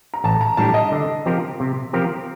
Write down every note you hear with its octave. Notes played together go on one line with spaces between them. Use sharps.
A#5
A1 A5
A#5
A2 G3 D4 G4 A5
D#5
D3
F3 C4 G4 A#4
C3
F3 C4 G4 A#4